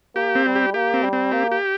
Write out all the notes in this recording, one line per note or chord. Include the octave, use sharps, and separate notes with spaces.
A#3 G4
C4
G3
G4
A#3 G4
C4
G3
C4
A#3 G4
G4